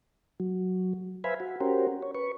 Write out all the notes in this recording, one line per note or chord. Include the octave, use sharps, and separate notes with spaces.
F#3
B4 C5 E5 F5 G#5 B5
F#4
C#4 F#4 G4 A#4 C5
C#5
B4 C#6